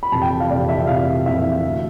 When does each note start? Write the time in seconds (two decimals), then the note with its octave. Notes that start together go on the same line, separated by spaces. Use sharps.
0.03 B5
0.12 F2 C3 E3 A5
0.22 G5
0.40 F5
0.50 F2 C3 E3 D5
0.68 E5
0.87 F2 C3 E3 F5
1.26 F2 C3 E3 E5
1.64 D2 C3 E3